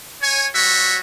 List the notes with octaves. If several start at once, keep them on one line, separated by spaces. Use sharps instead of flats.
C#5 G#5
G3 F#4 C#5 E5